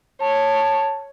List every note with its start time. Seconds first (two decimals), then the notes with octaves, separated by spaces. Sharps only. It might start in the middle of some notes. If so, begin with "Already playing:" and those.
0.22 C#5 A5